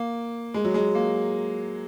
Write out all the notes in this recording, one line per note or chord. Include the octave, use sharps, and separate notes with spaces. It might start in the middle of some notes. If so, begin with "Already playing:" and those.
Already playing: A#3
G#3
F#3
G#3
A#3